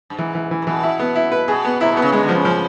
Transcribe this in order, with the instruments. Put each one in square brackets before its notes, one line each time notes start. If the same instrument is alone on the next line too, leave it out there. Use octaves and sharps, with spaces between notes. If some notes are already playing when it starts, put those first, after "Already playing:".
[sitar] G2
[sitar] G#2 [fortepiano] E3
[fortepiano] E3
E3
[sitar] A#2
[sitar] B2 [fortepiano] E3
[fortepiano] E4
B3
E4
B4
[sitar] B2 [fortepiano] G#4
[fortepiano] B3
[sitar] C3 [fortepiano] E4
[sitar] B2
[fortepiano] B3
[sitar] C#3
[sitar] C#3 [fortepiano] G#3
[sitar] D3
[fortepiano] F3
[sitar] C#3
[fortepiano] F3